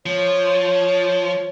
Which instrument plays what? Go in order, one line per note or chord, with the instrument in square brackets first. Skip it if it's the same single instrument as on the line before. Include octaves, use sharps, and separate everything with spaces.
[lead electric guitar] F3 [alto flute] C#5